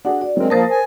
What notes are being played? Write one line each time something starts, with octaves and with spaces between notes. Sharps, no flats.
D4 F#4 G#4 F#5
F#4 D5
F#3 G#3 C4 D4 A#4
F3 A#3 A#4 C5 A5 D#6 A6
G#5